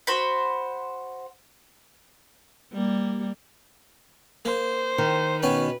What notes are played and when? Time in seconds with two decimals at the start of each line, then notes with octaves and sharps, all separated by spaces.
0.07 F#4 C5 B5
2.73 G3 A#3
4.45 A#3 C5
4.98 D#3
5.43 B2 C#4 B4 G5